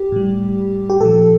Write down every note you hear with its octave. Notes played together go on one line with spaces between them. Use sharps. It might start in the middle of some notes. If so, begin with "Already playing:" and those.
Already playing: G4
A2 G3
G4
A#2 F3 A4